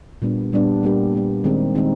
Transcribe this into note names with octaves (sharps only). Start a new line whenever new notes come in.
A#2 G3 B3 D4
A#2 G3 B3 D4
G3 A#3 D4 G4
G3 A#3 D4 G4
D#3 G#3 C4 D#4
D#3 G#3 C4 D#4